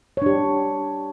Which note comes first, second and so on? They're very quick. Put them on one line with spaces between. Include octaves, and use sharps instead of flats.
C#5 D4 G4